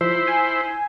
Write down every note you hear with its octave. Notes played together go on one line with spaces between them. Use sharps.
F3 E4 C5
G#5